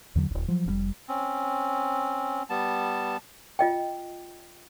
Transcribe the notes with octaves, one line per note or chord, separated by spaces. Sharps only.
E2 D3 F#3
D#1 C#2
F3 F#3
F1 A#2 G3
C4 C#4
G3 B3 A5
F4 D#5 G5